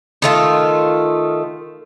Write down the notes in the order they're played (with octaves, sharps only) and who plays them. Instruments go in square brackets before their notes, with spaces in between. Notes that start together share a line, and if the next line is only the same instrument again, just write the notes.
[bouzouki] D#3 A3 F4